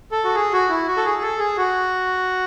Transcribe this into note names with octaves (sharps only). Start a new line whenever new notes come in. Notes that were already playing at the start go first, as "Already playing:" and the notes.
A4
F#4
G#4
F#4
E4
F#4
A4
G#4
A4
G#4
F#4